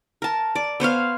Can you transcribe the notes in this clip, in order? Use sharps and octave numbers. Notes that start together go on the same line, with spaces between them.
A#4 A5
D5
B3 C5 C#5 F5